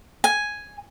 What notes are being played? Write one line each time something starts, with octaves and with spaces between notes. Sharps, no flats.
G#5